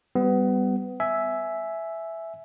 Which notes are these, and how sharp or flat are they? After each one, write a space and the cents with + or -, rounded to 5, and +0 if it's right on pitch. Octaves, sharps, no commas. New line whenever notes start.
G3 +0 B3 +25
E5 +0 G#5 +15